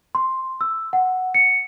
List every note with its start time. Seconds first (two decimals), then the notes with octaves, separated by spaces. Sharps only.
0.15 C6
0.61 E6
0.93 F#5
1.34 C#7